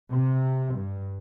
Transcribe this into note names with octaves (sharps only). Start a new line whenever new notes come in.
C3
G2